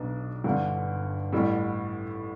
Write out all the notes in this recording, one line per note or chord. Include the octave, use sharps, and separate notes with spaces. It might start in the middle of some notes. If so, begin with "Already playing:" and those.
Already playing: B1 B2 B3 D4
G1 G2 D3
A1 A2 G3